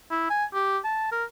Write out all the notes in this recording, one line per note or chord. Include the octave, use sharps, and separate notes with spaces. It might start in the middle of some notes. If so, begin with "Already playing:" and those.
E4
G#5
G4
A5
A#4